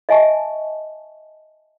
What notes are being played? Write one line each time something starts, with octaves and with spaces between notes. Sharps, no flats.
D#5 E5 G#5 A5 C#6